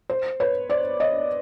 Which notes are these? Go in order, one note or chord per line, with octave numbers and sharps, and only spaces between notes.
C5
B4 C#5
C5 D5
C#5 D#5